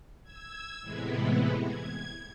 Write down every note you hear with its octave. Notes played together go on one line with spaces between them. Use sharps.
E6 G#6
A2 C3 E3 G#3 B3 E4
G#6